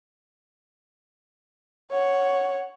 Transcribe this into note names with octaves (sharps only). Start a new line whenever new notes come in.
C#5 F#5